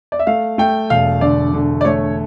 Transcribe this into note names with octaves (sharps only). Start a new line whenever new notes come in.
D5
E5
A3 F5
A3 G5
E1 F5
D3 D5
D3
D5
A3 C#5